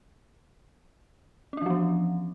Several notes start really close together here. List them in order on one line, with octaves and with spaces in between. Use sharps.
C#4 D4 E3 F3 B3